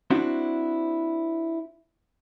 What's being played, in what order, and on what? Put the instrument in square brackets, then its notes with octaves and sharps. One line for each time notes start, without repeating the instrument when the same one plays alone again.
[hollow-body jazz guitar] C4 D4 E4 F#4